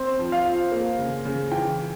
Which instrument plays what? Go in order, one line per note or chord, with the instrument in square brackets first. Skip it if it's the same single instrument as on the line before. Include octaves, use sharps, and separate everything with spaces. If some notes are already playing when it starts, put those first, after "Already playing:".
Already playing: [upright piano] C4 [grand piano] C5
[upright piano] F3
[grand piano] F5
[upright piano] F4
A#3
C#3
C#3
[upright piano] E3 [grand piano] G5